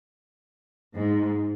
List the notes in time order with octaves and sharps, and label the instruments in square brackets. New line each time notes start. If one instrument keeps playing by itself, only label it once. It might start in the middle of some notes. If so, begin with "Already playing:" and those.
[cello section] G#2